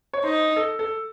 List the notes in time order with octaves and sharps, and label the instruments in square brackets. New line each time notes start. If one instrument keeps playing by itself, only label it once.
[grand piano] C#5
[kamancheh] D#4 [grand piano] C5
[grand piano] A4
A4